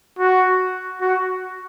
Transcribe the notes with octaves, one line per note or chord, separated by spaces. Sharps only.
F#4
F#4